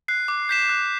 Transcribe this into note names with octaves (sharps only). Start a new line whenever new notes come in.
F#6 C7
D6
G6 B6 E7
F#6